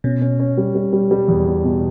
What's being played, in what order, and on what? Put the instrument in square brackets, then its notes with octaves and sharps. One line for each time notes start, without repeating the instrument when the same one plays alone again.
[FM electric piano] B2 [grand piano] C#4
[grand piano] C#4
C#4
G3
G3
G3
G3
E2
B2
B2